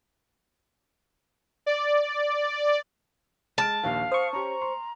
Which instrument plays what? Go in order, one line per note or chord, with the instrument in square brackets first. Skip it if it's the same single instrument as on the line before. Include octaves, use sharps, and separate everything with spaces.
[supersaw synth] D5
[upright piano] G#3 F6 D7 [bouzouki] A5
[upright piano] A#1 D#2 [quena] F5
[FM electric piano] C5 C#6 [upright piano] D#6
[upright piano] C#4 G4 [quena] A#5
[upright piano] C6